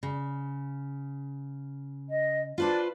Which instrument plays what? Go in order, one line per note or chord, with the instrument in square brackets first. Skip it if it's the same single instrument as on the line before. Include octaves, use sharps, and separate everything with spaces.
[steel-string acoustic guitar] C#3
[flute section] D#5
[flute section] D4 [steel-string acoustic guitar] F4 B4 C5